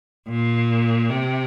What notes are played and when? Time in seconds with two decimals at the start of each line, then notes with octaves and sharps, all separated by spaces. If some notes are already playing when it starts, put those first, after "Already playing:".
0.29 A#2
1.09 C3